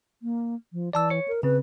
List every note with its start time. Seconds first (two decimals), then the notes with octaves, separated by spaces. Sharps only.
0.22 A#3
0.73 F3
0.93 E3 D5 A5 E6
1.10 C#5 C#7
1.28 A#4
1.43 C#3 C4 B4